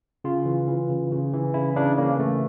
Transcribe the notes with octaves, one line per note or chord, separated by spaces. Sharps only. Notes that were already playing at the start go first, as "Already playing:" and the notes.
C#3 F4
E3
E3
C#3
C#3
E3
C#3 E4
C#3 D4
E3 A#3
C#3 A3